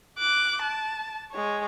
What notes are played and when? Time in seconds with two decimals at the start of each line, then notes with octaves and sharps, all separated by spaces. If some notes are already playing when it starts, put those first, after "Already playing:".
0.18 D6 F#6
0.62 A5
1.32 G#3 C#5